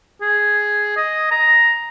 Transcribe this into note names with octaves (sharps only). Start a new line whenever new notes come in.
G#4
D#5
A#5